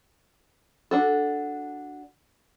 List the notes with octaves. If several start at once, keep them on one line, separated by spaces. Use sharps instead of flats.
D4 F#4 A4